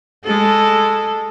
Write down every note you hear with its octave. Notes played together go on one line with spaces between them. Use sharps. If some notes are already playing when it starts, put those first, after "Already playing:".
G#3 A4